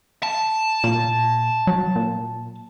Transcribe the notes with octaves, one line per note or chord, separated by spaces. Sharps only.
A5
A#2
F#3
A#2